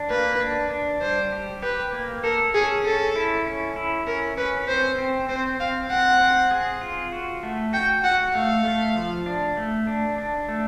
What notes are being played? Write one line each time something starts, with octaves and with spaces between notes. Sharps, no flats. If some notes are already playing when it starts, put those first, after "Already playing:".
Already playing: D4
A#3 B4
D4
D4
G3 C5
G4
G4 B4
A#3
A4 A#4
C#4 G#4
C#4 A4
E4
C#4
E4
C#4 A#4
C#4 B4
C4 C5
C4
C4 C5
C4 F5
C4 F#5
C4
G#4
F4
F#4
A3
F#4 G5
F#4 F#5
A3 F5
A3
F3
D4
A3
D4
D4
A3